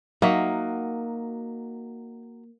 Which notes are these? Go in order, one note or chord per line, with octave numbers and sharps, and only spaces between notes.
F#3 A#3 D#4 F#4 E5